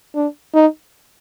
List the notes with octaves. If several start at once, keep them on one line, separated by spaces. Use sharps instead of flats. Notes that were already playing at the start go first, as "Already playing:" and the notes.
D4
D#4